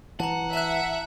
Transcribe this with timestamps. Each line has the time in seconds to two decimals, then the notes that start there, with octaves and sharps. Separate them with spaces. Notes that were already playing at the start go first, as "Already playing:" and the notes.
0.20 E3 F#5 A5 A#5
0.53 E5 A5 F#6